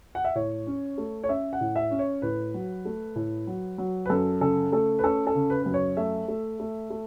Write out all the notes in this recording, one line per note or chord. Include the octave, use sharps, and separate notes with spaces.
F#5
E5
A2 C#5
C#4
A3
C#5
C#4 E5
F#5
A2
E5
C#4
C#5
A2 B4
F#3
A3
A2
F#3
F#3
B4
F#2 A4
C#3 A4
A3 A4
B4
C#4 A4
A4
C#3
B4
F#2 B4
C#5
A3 E5
A3
A3
A3